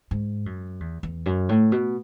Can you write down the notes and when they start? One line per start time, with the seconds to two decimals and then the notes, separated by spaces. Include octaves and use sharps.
0.11 G#2
0.46 F#2
0.80 E2
1.03 E2
1.26 F#2
1.49 A2
1.72 B2